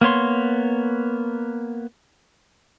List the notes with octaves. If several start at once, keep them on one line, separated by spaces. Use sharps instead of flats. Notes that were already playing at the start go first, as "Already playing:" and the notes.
A#3 B3 C#5 C6